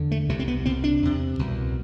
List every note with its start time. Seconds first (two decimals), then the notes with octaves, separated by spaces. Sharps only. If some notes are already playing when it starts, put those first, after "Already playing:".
Already playing: E2 D3
0.11 A3
0.29 C2 C3 A3
0.39 C4
0.48 B3
0.65 C2 C3 C4
0.84 D4
1.02 E2 C3
1.39 C2 B2